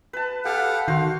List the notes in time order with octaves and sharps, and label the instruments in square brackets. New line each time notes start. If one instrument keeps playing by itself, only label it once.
[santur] B4 A5
[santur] G4 [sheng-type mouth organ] A4 F5 F#5
[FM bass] D#3 [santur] F#4 C5 [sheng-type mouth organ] F5